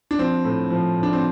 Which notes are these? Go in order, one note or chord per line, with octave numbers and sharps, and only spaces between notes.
D4
F3 C4
A2
F3
A2
D4
C4